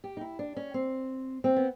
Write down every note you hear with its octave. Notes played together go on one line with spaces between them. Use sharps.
G4
D#4
E4
D4
C#4
C4
C4
B3